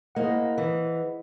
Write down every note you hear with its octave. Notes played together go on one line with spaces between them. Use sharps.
A#3 E4 G#4 C5 D#5 F#5
E3